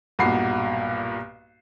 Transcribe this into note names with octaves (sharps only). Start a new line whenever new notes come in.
B1 G2 A#2 F#4 B5 C7